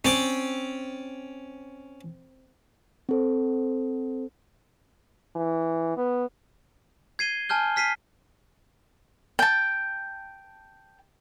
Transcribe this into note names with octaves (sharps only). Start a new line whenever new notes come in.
C4 C#4 D5
C4 A4 C5
E3
B3
G#6 C7 D#7 G7
G#5 A5 F6 G6 G7
F6 B6 C7 D#7
G5 A5